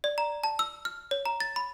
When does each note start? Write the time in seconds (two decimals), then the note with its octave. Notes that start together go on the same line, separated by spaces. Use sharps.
0.04 D5
0.18 A#5
0.44 A5
0.59 E6
0.85 F6
1.11 C#5
1.25 A#5
1.40 A6
1.56 B5